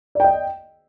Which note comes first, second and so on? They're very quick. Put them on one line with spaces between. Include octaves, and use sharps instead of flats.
D5 G5 D#5